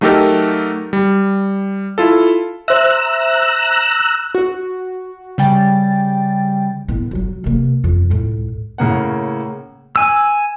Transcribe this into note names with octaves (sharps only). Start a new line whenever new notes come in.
F#3 A3 D#4 G4 A4 A#4
G3
E4 F4 A4
C5 E5 A#5 E6 F#6
F#4
C#3 G3 G5 A6
A2 B3
D2 F#3
C3 A#3
F2
C#2 A2
A2 C#3 A#3 F#5
G#5 E6